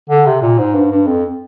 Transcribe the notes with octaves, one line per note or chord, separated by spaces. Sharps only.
D3
C3
A#2
G#2
G2
G2
F2